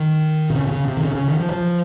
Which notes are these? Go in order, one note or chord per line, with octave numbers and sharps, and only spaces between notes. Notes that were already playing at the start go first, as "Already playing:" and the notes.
Already playing: D#3
C3
C#3
C3
C#3
C3
D#3
C#3
C#3
D#3
F3
F3